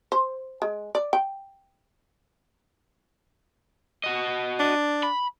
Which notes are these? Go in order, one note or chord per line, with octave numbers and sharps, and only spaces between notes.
C5
G#3
D5
G5
F#4 D#5
D4
B5